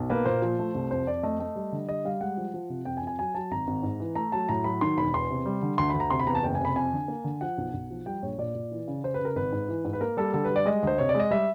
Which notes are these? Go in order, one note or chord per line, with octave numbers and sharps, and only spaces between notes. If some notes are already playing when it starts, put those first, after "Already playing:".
Already playing: B1
A#3 B4
A#2 C5
F3
A3
C2
F2 C5
F2 D5
A3 D#5
A3
G3
D3
G3 D#5
G3 F5
G#3 F#5
F3
F3
C3
F2 G5
G#5
F2
G#5
F#3 G#5
F#3 A5
G#1 A#5
G#1
G#2
E3
A3 A#5
F#3 A5
A2 A#5
F#3 B5
D#3 C6
E1 B5
E2 C6
C3
G3
D3
D2 C6
D2 B5
A#5
C3 C6
B5
E2 A#5
A5
F#1 G5
G#5
C3 B5
F2 G#5
D3
A#3
D3
F3 F#5
B1
B1
F3
G3 G5
A#1 C#5
A#2 D5
A#2
E3
C#3
C#3 C5
C#3 B4
A#4
G#1 B4
G#2
E3
G#2
B4
A#3 A#4
G3 A4
D3 A4
B4
G3
D5
G#3 D#5
D2 C5
C3 C#5
D5
G#3
D#5
G3 E5